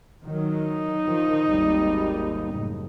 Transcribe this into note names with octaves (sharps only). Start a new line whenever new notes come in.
D#3 F#3
D#4
D#3 F3
G#1 D#2 G3
F#1 A2